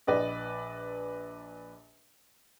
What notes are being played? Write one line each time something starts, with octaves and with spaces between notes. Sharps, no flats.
A#1 B4 D5 D#5